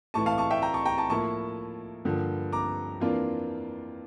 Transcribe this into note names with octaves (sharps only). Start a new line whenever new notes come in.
A2 E3 A3 E4 A5 C#6
F5 A5
A5 C#6
E5 G5
G5 A#5
A5 C#6
G5 A#5
A5 C#6
A2 F3 A#3 E4 A5 C#6
G2 D3 F3 A#3
A#5 D6
F2 E3 A#3 D4 F4